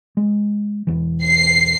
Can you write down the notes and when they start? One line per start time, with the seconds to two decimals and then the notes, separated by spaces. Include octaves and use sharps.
0.17 G#3
0.87 E1 E2 E3
1.24 C7